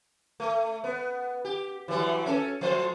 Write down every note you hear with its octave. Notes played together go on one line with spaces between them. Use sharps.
A3
B3
G4
E3 F#3 G3
C#4 A4
F3 A3 C5